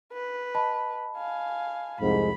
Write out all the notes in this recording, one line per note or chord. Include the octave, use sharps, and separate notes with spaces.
B4
D#5 A5 B5
F5 G#5
C2 F2 G#2 B5